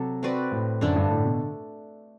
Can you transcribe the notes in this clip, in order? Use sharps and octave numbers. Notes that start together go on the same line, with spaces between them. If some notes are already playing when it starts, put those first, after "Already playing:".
Already playing: C3 F#3 A4
C4 F#4 B4 D5
A2
F#2 D3 A3 D4 A4
G2
A2
B2